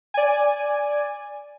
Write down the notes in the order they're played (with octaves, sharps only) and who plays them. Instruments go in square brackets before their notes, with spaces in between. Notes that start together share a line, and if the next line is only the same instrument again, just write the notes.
[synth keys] D5 G#5